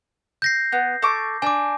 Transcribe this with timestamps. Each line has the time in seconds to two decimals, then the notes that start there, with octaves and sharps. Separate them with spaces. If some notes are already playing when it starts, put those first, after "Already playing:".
0.42 G6 A#6 C7
0.72 B3
1.02 A4 C#6 D6
1.42 D4 G#5 D6